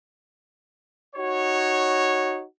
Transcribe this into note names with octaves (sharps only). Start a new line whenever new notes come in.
D#4 F#4 C#5